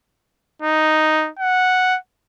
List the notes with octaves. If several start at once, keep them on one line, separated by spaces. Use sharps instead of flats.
D#4
F#5